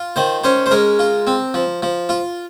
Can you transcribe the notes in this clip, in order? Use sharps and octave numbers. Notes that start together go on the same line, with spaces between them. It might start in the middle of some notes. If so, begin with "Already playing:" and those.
Already playing: F4
D#3 C5
C#4 C5
C5
G#3 A#4
F4
C4
F3
F3
F4